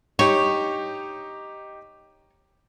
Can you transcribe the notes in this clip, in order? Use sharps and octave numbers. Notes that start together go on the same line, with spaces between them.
D#4 G4 C#5